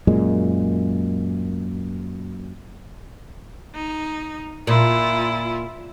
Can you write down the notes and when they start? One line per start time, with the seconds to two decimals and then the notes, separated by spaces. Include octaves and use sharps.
0.07 F#2 A#2 G#3
3.75 D#4
4.67 A#2 E4 F4